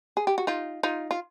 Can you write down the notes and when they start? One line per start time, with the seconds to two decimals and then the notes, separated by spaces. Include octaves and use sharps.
0.17 G#4
0.27 G4
0.38 F#4
0.47 D#4 F4
0.83 D#4 F4
1.11 F4